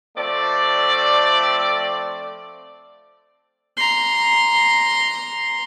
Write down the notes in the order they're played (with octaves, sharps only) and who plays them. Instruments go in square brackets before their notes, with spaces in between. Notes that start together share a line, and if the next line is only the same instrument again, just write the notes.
[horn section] F3 A3 C4 D5
[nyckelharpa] A#5 C6